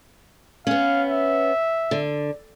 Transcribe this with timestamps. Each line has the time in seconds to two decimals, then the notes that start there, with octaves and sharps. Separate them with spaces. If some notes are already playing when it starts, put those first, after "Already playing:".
0.67 B3 C#4 F5
1.09 E5
1.91 D3